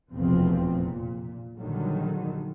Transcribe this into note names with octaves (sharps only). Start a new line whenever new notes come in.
F1 A#1 E2 B2 F3 C4
A#2
A#1 D3 D#3 F#3 G3